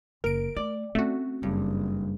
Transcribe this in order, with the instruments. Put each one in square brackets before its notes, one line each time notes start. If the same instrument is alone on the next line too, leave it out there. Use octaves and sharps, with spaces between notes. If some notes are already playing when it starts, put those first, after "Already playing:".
[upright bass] F#1 [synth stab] A#4 D7
[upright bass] A3 [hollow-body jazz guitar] D5
[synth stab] A3 F#4 [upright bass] C4 C#4
[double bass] F#1 [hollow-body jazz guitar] G2